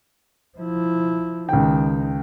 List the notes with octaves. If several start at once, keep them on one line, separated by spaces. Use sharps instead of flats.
F3 E4
C#2 D#3 G5